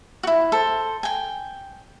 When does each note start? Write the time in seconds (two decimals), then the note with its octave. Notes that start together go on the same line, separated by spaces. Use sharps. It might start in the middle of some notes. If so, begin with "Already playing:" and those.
0.23 E4 F#4
0.52 A4 C5
1.03 G5 G#5